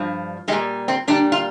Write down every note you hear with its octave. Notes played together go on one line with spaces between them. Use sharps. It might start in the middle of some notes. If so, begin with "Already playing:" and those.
Already playing: G2 F3
A#2 G3 G#3
C4
A#2 G3 D4
F4